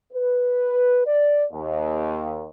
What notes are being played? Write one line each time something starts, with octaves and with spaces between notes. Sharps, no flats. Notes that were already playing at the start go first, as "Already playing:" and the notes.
B4
D5
D#2